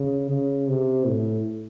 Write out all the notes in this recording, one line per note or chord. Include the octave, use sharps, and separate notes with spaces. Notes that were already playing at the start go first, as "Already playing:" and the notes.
Already playing: C#3
C#3
C3
A2